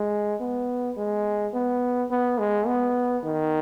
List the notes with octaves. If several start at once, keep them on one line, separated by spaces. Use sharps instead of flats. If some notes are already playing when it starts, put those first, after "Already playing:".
Already playing: G#3
B3
G#3
B3
B3
G#3
B3
D#3